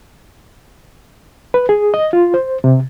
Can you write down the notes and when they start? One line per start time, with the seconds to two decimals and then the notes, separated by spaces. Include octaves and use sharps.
1.54 B4
1.69 G#4
1.94 D#5
2.13 F4
2.34 C5
2.64 C3